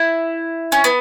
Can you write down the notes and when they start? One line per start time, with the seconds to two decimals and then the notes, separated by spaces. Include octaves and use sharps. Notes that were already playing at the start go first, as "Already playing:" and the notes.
Already playing: E4
0.72 C#4
0.84 B3